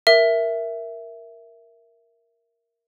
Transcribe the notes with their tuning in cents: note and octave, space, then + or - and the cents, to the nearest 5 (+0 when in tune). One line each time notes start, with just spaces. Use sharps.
A#4 +0 E5 +5